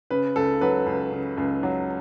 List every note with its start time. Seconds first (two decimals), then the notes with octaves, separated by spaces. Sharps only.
0.10 C#3 B4
0.36 C#2 A4
0.61 F#3 B4
0.86 C#2
1.12 C#3
1.37 C#2
1.63 F#3